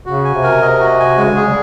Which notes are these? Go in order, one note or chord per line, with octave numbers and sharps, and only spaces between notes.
C#3 F#4
G#5
C3
A#4
C3 D#5
F#4
G#5
C#3 G#3
D3
C#3 G#4
G3